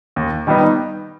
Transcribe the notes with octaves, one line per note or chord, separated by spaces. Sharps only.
D#2
D#3 G3 B3 D#4